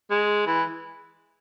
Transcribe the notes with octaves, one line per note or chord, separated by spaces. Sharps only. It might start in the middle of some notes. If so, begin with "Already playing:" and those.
G#3
E3